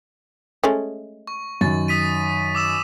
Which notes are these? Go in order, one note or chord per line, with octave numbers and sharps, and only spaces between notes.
G#3 A3 C#4
C#6
F#2 D#3 C#6 A6
D#6 B6 D#7
D6 E6 E7